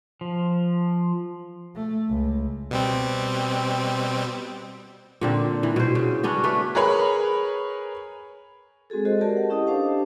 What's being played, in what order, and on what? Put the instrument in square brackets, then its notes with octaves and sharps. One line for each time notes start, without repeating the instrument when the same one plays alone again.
[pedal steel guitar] F3
[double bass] A3
C#2
[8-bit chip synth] B2 G3 C4
[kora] A#2 D3 C4
E3
B2 C5
C#3
B3 C#4 D4 F#4
A3 D4 B4
[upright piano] G#4 A#4 B4 C#5 B5
[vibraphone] G#3 C4 F#4 G#4 A4
F#4 G4 A4 C5 D#5
G4 A#4 D5 A5
F#5
C#4 E4 G4 D#5 D#6
D4 G4 A4 C5 F5 A5